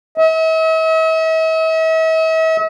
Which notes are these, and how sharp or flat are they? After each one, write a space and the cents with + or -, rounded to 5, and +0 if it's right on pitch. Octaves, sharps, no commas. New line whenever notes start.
E5 -45